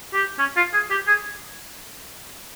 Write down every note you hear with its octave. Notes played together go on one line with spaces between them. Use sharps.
G4
C#4
F4
G#4
G4
G#4